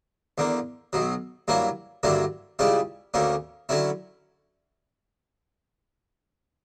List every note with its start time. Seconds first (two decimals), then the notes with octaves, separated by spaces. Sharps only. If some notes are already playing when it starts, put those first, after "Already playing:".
0.38 E2 D3 A#3
0.93 B1 B2 F#3
1.48 G2 F#3 A#3 E4
2.03 G2 D3 F#3 A#3 E4
2.59 C#2 C#3 G3 C#4 E4
3.14 D2 D3 A#3 C#4
3.69 D3 F#3 C#4 E4